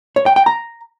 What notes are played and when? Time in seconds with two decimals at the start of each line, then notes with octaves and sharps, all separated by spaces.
0.16 C#5
0.26 G5
0.36 G5
0.46 A#5